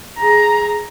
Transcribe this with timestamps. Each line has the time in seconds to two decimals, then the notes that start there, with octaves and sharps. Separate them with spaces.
0.19 G#4 A#5